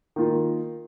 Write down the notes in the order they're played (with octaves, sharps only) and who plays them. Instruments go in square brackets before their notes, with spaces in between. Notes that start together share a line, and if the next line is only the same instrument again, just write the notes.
[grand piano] D#3 A#3 F4